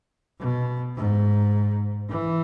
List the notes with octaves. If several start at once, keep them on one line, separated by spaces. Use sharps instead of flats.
B2
G#2
E3